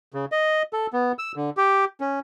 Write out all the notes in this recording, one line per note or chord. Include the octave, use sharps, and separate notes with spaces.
C#3
D#5
A4
B3
E6
D3
G4
C#4